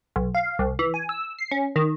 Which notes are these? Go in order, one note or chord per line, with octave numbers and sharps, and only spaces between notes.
B1
F5
C2
E3
G#5
E6
C7
C#4
D#3